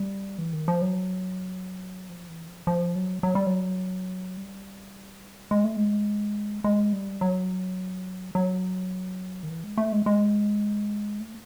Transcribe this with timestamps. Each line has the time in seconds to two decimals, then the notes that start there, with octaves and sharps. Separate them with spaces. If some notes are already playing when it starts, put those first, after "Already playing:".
Already playing: G3
0.38 E3
0.53 D#3
0.68 F3
0.82 F#3
2.09 F3
2.29 E3
2.48 F3
2.67 F3
2.96 F#3
3.23 F#3
3.35 G3
3.47 F#3
4.37 G3
5.51 G#3
5.64 A3
5.77 G#3
6.64 G#3
6.93 G3
7.21 F#3
8.35 F#3
9.43 D#3
9.50 E3
9.64 G#3
9.78 A3
9.92 G#3
10.06 G#3
11.20 A3